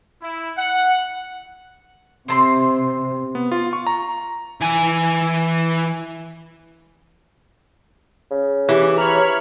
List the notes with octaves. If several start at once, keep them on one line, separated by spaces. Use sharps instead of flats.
E4
F#5
C3 C4 A5 C6
B3
F4
C#6
A#5
E3 G#5
C#3
E3 G4
C#5 A#5 B5 F6